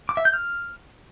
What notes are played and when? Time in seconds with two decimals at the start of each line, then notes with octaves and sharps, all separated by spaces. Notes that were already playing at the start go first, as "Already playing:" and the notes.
0.09 D6
0.17 E5
0.25 G6
0.33 F6